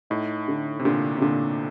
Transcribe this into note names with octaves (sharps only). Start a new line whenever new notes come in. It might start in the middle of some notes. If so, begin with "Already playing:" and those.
A2 D#4
D3
C3
A#2 D3
C3
A#2 D3